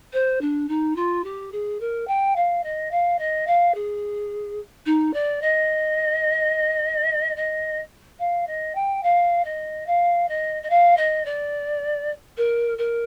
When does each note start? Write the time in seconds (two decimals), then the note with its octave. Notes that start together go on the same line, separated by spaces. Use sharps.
0.13 C5
0.41 D4
0.68 D#4
0.96 F4
1.24 G4
1.52 G#4
1.80 A#4
2.07 G5
2.36 F5
2.63 D#5
2.91 F5
3.18 D#5
3.47 F5
3.74 G#4
4.86 D#4
5.13 D5
5.41 D#5
7.36 D#5
8.19 F5
8.47 D#5
8.75 G5
9.03 F5
9.44 D#5
9.86 F5
10.28 D#5
10.63 D#5
10.70 F5
10.97 D#5
11.25 D5
12.37 A#4
12.78 A#4